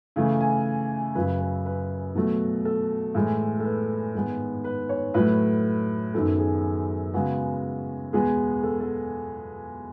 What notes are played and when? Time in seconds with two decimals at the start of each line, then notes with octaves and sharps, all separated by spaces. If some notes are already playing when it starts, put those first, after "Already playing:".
0.16 C#3 E3 A3
0.40 G#5
1.15 F#2 C#3 F#3 B4
1.41 B4
1.66 B4
2.15 B2 F#3 A3
2.65 A4
3.15 A2 E3 G#3
3.60 A4
3.64 B4
4.14 G#2 D#3 G#3 B3
4.64 B4
4.89 C#5
5.14 A2 F#3 A3 B4
6.14 F#2 D#3 F#3 B3 A4
6.39 G#4
7.14 C#3 G#3 B3 F#4
8.13 E2 B2 G#3 B3 G#4
8.63 A4
8.80 A4